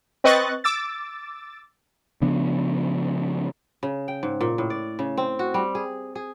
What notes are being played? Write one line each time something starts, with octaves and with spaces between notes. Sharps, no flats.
C4 B4 D#5 C#6 F#6 A6
D6 E6 A6
C#3 F3 B3 D4
C#3
G5
G#2
A#2
A2
D5
C#3
C4
F#4
G3
G#4
G#4